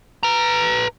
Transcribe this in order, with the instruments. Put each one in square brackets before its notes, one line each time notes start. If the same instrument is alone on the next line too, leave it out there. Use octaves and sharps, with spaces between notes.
[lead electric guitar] B4 A#5